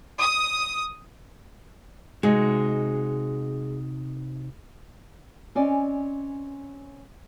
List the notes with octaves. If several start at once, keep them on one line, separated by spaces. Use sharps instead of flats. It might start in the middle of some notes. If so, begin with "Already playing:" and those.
D#6
C3 G#3 D#4 F#4
C4 C#4 D5 D#5 G#5